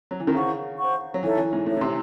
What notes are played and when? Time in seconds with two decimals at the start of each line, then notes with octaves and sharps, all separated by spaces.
0.11 F#3
0.20 E3
0.27 D#3
0.34 C#3 C5 F#5 C#6
0.79 C5 F#5 C#6
1.14 F#3
1.23 E3 D#4 A4 C#5 E5
1.37 E3
1.53 G#2
1.66 A2 D#4 A4 C#5 E5
1.77 A2
1.81 C3